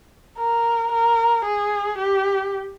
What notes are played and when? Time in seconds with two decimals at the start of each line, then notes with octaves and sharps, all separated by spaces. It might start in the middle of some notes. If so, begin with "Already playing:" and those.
0.38 A#4
0.92 A#4
1.45 G#4
1.98 G4